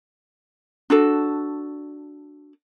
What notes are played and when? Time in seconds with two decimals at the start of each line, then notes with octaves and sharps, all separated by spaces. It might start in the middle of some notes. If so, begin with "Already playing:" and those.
0.90 D4 F#4 A4